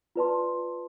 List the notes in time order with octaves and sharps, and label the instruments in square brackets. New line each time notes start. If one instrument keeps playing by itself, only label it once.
[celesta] F4 B4 D5 A5 C6